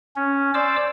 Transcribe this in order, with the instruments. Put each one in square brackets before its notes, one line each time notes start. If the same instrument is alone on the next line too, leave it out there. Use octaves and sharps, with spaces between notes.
[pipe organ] C#4
C5 D5 D6 E6